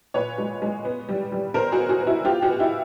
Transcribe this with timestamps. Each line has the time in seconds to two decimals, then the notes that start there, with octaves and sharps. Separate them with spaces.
0.14 A#2 B4 C#5
0.38 G#3
0.62 G#3
0.85 B3
1.09 G3
1.32 G3
1.54 B3 A#4 C5
1.72 F#4 G#4
1.78 B3
1.89 F#4 G#4
2.01 B3
2.07 E4 F#4
2.25 B3 F4 G4
2.42 F#4 G#4
2.48 B3
2.60 E4 F#4